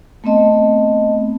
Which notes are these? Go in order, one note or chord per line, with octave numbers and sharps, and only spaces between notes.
A3 B3 C4 D#5 A5